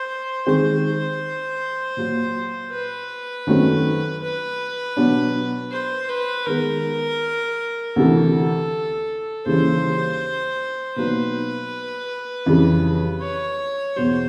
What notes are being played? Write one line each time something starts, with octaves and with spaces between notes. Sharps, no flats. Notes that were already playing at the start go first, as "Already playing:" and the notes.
Already playing: C5
D#3 G#3 C4 C5
A#2 F#3 A#3
B4
F#2 D#3 F#3 A3 C4
B4
B2 F#3 B3 D4
C5
B4
D#3 G#3 B3 A#4
D2 C3 E3 A4
D#2 C#3 E3 G3 C5
B2 F#3 A#3 D#4 B4
F2 C#3 E3 G3
C#5
E2 B2 F#3 C5